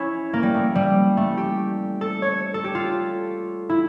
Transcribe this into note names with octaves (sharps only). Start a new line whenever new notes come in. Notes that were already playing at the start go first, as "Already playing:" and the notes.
Already playing: C#4 E4 C#5
A#3
G3
A3
G3
A3
G4
A4
C#5
A4
G4
F4
E4